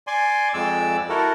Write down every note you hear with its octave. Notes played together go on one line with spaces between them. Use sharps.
D5 G#5 C6
F2 G#3 D5 E6
E4 F#4 A4 A#4